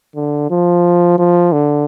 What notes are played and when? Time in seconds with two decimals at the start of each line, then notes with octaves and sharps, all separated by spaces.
0.16 D3
0.51 F3
1.18 F3
1.52 D3